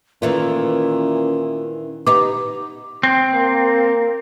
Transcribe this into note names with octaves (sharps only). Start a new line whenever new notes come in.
A#2 D#3 E3 A3 C#4
B3 D#4 G4 D6
C4
A#3